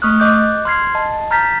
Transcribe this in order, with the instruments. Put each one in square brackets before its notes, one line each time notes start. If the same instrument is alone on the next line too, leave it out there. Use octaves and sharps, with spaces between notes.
[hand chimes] A3 C#6 D#6 F6 F#6
D#5 D6 F#6 G6
C6 F6 G#6 C7
D#5 A5
A#5 F6 G6 A6 B6